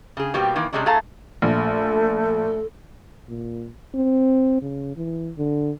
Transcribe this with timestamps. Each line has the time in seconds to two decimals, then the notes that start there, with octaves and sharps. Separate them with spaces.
0.17 C#3 G#4
0.34 B2 G3 A#3 C4 G4
0.56 D#3 E3 A#3
0.73 C3 E3 G3 G#3 C#4 D4
0.86 A2 A3 G#4 F5 A5 A#5
1.42 A#1 A3 A4
3.29 A#2
3.95 C4
4.62 C#3
4.96 E3
5.38 D3